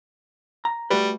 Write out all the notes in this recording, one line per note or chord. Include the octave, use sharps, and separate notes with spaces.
A#5
G3 A3 F#4 B4